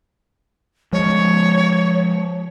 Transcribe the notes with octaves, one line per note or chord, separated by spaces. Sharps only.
F3 G#3 C#5